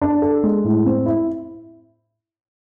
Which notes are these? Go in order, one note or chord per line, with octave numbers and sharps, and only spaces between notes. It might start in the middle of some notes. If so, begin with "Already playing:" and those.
D4
A4
G#3
A2
C4
E4